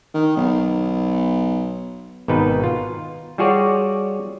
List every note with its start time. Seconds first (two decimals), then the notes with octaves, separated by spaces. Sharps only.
0.14 D#3
0.37 B1
2.28 G#1 B2 D#4 B4
2.64 F4
3.38 G3 F4 F#4 G#4 C#5 D5